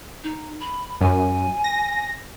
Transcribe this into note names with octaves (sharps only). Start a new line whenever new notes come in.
D#4
B5
F#2 G#5
A#6